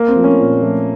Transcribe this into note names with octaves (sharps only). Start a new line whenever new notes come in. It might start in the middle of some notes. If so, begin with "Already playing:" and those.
Already playing: A#3
C4
F3 A3
C#4
A#2
F3 A3